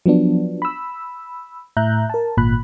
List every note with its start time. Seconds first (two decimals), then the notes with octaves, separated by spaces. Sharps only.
0.06 F3 F#3 B3 D4
0.62 B5 E6
1.77 A2 E5 A#5 F#6 G6
2.10 A#4 A5
2.37 G#1 A#2 B5 F#6